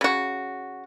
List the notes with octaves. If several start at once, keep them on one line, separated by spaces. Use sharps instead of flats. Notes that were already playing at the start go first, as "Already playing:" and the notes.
C#3 F#4